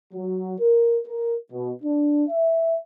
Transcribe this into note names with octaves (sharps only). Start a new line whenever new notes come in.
F#3
A#4
A#4
B2
D4
E5